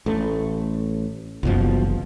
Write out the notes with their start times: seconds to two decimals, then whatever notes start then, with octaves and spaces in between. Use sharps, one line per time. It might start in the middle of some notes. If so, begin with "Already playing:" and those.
0.06 A1 A3
1.43 F#1 C2 B2 E3 F3